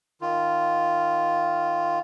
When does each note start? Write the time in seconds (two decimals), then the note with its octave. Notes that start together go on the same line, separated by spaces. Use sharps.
0.21 D#3 F4